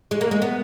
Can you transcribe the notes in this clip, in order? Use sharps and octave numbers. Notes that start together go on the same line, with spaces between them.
G#3
A#3
G#3
B3